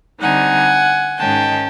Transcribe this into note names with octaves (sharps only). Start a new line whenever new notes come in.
D3 G3 C4 D#4 F#5 G#5
G#2 D#3 G#3 C#4 G5 A5